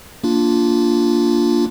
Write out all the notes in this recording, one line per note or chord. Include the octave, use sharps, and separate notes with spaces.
A#3 D4 F4